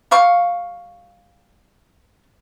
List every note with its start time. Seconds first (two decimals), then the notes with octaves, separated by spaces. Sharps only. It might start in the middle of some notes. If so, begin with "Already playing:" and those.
0.11 G3 F5 C#6